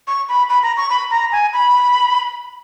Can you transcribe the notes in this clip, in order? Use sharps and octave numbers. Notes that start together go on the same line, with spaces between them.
C#6
B5
B5
A#5
C#6
B5
A#5
G#5
B5